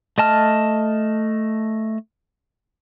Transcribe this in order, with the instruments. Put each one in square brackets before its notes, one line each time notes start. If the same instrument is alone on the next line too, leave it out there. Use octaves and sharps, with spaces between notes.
[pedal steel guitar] A3 D#5 A5 F6